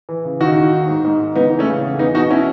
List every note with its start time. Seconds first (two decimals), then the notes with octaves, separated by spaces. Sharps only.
0.09 E3
0.25 C#3
0.40 D#2 D#4 F#4
0.57 D#2
0.72 D#3
0.88 G#2
1.05 G#2
1.20 D#3
1.36 C#2 B3 D#4
1.51 E3
1.59 A3 C#4
1.67 C#3
1.83 E2
1.99 E2 B3 D#4
2.15 B2 D#4 F#4
2.31 C#4 E4